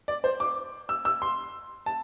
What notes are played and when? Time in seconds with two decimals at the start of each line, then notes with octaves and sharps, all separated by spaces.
0.08 D5
0.24 C5
0.40 D6
0.89 E6
1.05 E6
1.22 C6
1.86 A5